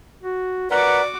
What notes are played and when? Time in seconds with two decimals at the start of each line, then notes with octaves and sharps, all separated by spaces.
0.23 F#4
0.71 F#4 A#4 B4 D5 F#5 D6